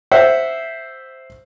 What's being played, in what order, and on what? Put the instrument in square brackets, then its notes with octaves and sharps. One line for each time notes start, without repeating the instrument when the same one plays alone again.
[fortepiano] C5 E5 F#5